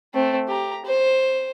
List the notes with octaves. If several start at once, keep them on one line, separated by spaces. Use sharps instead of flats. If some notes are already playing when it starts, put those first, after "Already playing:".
A3 C4
G4 A#5
C5